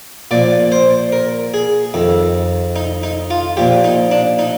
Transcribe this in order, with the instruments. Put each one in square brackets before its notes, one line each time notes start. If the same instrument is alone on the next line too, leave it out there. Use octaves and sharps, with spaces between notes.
[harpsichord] A#2 F3 D5
C5
A#4
G#4
F2 D#3
D#4
D#4
F4
A#2 F3 G4
D#4
D4
D#4